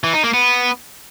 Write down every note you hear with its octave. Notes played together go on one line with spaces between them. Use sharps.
E3
D#4
A#3
B3